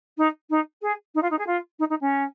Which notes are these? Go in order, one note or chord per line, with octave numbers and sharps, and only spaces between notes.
D#4
D#4
G#4
D#4
F4
D#4
G#4
F4
D#4
D#4
C#4